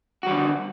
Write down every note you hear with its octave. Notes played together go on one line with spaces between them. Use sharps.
D3 G3 F#4